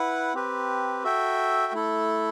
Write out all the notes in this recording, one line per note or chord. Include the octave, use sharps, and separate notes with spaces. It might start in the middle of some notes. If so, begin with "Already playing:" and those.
Already playing: E4 B4 F#5
C4 G4 B4
F#4 A4 E5 G5
A3 E4 A4